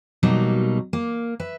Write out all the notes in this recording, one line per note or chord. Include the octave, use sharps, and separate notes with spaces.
B2 F#3 G3 A#3 D#4
A#3
B4 E5